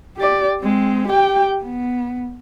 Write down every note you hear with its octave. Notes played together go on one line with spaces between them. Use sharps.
G4 D5
G#3 C4
G4 G5
B3